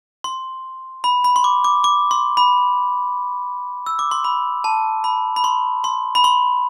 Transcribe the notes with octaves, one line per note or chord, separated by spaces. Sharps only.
C6
B5
B5
C6
D6
D6
D6
C6
B5
E6
D6
C6
B5
A5
B5
B5
C6
C6
B5
C6